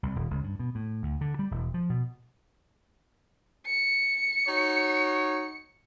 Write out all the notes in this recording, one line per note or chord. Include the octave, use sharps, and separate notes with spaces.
C2
D#1
C#2
G2
B2
A2
D2
D3
G3
E1
F3
B2
C#7
D#4 F#4 C#5